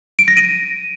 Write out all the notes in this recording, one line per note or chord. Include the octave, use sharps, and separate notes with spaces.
D7
A#6
D#7